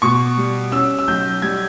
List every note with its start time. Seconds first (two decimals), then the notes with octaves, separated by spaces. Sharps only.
0.02 B2 C#6
0.37 G3
0.72 C#4 E6
0.99 E6
1.07 B1 G6
1.42 G3 G#6